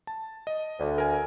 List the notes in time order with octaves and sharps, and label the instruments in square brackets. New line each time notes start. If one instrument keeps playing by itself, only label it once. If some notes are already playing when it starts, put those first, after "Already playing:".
[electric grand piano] A5
D#5
[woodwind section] D2
[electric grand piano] A#4 G#5